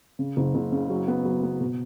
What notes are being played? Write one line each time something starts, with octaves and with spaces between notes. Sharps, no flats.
C#3
F#1
F#1
C#3
F#3
B3
F#3
B3
B2